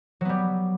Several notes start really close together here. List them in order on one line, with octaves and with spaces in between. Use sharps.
F#3 B3 G3